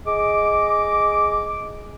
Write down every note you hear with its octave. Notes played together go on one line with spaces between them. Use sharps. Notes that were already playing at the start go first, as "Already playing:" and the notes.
G#4 D#5 D6